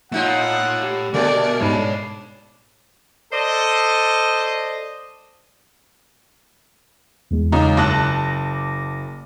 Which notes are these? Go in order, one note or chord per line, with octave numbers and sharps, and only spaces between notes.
A2 A3 D#4 F4 C#5 F#5
G4
A#2 D3 G3 A3 A#4 D5
G#2 G#3 D4 C#5 B5
A4 C5 D5 D#5
E2 G#3
C#2 D#4
F#1 A5 D6 F#6 A#6